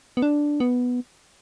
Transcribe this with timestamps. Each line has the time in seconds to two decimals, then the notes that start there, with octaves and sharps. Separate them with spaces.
0.17 B3
0.22 D4
0.60 B3